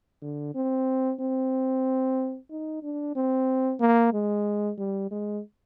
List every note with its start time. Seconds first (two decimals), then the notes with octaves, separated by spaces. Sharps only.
0.22 D3
0.55 C4
1.20 C4
2.50 D#4
2.83 D4
3.15 C4
3.80 A#3
4.13 G#3
4.78 G3
5.11 G#3